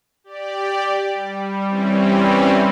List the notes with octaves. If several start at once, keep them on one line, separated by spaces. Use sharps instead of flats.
G4 D5
G3
E3 G3 C4 C#4